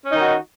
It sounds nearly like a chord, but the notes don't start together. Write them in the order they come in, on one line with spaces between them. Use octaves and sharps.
C#4 D#4 D#3 F#4